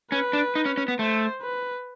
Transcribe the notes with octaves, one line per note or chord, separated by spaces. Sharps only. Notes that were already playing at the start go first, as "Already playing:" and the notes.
C#4 B4
D4
D#4
C#4
C#4
B3
A3 C5
B4